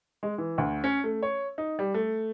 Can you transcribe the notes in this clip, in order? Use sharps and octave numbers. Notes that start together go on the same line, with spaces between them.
G#3
E3
D2
C#4
A3
C#5
D#4
G3
A3